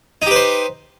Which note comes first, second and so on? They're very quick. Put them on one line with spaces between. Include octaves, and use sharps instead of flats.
D#4 G4 B4 C5